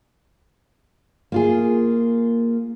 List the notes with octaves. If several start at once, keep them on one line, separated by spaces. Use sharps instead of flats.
A#3 F4 G#4